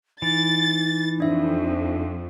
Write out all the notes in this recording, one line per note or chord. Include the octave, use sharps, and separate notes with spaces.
E3 D#4 A6
F2 D4 E5